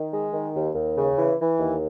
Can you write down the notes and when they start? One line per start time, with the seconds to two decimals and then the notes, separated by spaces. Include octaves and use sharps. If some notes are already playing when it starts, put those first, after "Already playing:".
Already playing: D#3
0.11 G#3
0.33 D#3
0.54 D#2
0.75 D#2
0.97 C#3
1.17 E3
1.39 E3
1.60 D#2